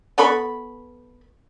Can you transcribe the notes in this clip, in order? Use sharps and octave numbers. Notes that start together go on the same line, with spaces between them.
B3 A4 B5 C#6